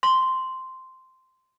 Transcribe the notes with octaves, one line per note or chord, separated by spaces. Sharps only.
C6